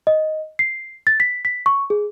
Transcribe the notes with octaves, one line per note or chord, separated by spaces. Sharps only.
D#5
C7
A6
B6
B6
C#6
G#4